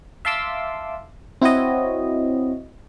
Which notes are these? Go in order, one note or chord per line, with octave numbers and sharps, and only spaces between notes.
E5 F5 A5 C6 D6 E6
C4 E4 F#4 C#5 D#5